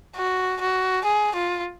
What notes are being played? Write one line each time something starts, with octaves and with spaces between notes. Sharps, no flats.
F#4
F#4
G#4
F4